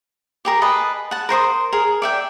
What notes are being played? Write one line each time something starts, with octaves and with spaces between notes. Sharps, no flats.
G4 G#4 A#4
G#4 B4 D#5 A5
F#5 A5
A#4 C5 C6 D#6
G#4 A#4
D5 E5 G5